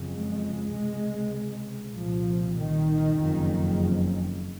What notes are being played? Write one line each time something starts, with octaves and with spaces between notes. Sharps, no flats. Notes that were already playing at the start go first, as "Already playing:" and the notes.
Already playing: F#1 F2 C#3
G#3
C#2 C3
C2 A#2 F3
D#3
F#1 F2 C#3